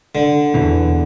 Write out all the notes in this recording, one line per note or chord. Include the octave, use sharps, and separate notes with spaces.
D3
E2 B2 E3